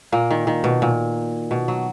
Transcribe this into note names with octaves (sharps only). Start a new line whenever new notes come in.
A#2 A#3
D#3
D#3
B2
A#2
B2
F#3